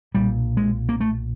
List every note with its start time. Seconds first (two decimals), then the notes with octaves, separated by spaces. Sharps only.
0.14 B1 A#2 G3
0.57 G#3
0.89 A#3
1.01 A3